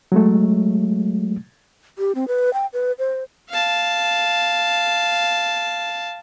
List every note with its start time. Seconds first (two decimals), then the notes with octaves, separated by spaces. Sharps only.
0.12 F#3 G#3 A3
1.98 G4
2.15 C4
2.28 B4
2.54 G5
2.73 B4
2.99 C5
3.49 F5 A5